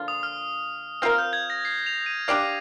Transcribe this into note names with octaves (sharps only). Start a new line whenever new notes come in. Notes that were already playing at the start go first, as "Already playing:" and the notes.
Already playing: D3 F3 A#3 F4
D#6
F6
C4 F4 A#4 F5 F6
G6
G#6
A#6
C7
F7
D#7
D4 G4 D5 F5 C7